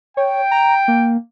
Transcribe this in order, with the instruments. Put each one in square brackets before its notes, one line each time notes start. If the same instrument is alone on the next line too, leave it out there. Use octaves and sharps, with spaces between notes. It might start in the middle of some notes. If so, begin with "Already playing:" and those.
[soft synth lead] C#5 [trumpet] G5
[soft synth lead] A#5
A#3